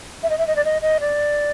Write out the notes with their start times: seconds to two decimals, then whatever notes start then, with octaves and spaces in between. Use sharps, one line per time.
0.23 E5
0.30 D#5
0.38 E5
0.47 D#5
0.56 D5
0.65 D#5
0.82 D#5
1.00 D5